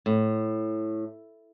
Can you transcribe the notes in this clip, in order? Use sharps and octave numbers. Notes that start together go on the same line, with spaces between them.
A2